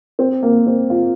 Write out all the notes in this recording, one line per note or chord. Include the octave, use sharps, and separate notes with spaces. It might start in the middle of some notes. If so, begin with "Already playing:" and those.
C4
A#3
C4
F4